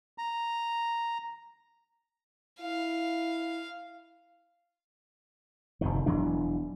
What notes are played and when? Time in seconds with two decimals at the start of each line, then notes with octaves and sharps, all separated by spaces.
0.18 A#5
2.61 E4 F5
5.81 F1 F#2 D#3
6.06 E1 E3 F#3 D4